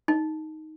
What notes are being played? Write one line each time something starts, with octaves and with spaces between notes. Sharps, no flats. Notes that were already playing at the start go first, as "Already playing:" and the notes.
D#4